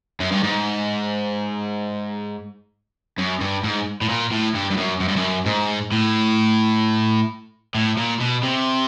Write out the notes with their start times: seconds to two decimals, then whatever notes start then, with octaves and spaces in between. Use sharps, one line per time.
0.20 F#2
0.32 G2
0.44 G#2
3.18 F#2
3.40 G2
3.64 G#2
4.01 A2
4.09 A#2
4.32 A2
4.55 G2
4.71 G2
4.77 F#2
5.00 F#2
5.08 G2
5.16 F#2
5.46 G#2
5.92 A2
7.74 A2
7.97 A#2
8.20 B2
8.43 C3